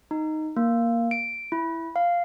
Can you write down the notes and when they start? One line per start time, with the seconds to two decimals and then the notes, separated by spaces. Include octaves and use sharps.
0.11 D#4
0.57 A#3
1.11 D7
1.52 E4
1.96 F5